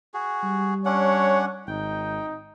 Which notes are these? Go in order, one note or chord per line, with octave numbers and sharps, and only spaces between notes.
F#4 G#4
G3
C#4 D4 C#5 F#5
G#1 D#4 G5